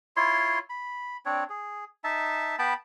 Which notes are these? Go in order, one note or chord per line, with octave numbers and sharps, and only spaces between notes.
E4 F4 C#5 C6
B5
C4 D4 C#5
G#4
D#4 E5 A5
B3 G5 A5 B5